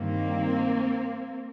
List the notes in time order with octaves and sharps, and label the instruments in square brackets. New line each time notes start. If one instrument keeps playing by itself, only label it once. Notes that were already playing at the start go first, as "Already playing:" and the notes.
Already playing: [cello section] G2 D#3 G3 A#3 C4